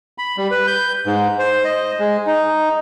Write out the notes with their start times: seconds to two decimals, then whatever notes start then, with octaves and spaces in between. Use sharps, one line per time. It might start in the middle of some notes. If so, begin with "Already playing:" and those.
0.18 B5
0.37 G3
0.51 B4
0.67 G6
1.06 G#2
1.39 C5
1.64 D#5
1.99 G#3
2.27 D#4